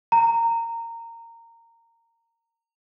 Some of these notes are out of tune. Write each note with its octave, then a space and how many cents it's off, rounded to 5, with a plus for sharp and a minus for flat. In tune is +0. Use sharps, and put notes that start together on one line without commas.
A#5 -15